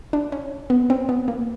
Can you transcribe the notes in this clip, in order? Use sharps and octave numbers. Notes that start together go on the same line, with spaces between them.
D4
C#4
B3
C4
B3
A#3